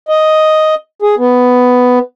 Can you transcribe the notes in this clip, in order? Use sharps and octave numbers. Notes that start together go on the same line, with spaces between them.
D#5
G#4
B3